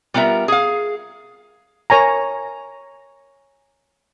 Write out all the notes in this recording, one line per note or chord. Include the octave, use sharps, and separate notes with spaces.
G3 B3 F4 A#4 E5
G#4 F5
A#4 C#5 G#5 A#5